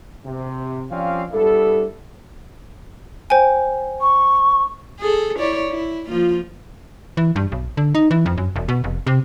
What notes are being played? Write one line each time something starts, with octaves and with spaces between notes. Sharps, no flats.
C3
F3 G3 C4 C#4 D5 F5
G3 B3 D4 E4 A4
C5 G5 G#5
C#6
G#4 A4
E4 C#5 D5
E4
F3 A#3 F4
E3
G2
B1
D3
D#4
E3
F2
F#2
E1
B2
F1
C3